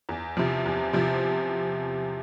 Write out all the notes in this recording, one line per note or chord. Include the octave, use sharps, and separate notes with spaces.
E2
C3 F3
E2
C3 F3